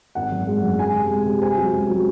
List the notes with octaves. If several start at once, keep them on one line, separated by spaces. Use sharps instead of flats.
G#1 F#5
F#2
G#3
F#2
G#3 G#5
C3
G#3
C3
C4 G#5
F#3
C#2
F#3